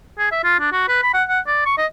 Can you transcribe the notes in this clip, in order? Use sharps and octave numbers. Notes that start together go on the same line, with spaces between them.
G#4
E5
F4
D4
F#4
B4
B5
F#5
F#5
D5
C#6
D#5